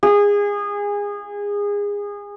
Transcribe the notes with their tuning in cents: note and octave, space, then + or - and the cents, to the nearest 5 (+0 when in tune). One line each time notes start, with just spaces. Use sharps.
G#4 -25